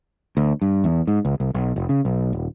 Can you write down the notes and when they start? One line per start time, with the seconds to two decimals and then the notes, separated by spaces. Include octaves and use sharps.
0.37 D2
0.62 G2
0.84 E2
1.07 G#2
1.25 C#2
1.40 C2
1.54 B1
1.76 F1
1.89 C#3
2.05 B1
2.33 D#1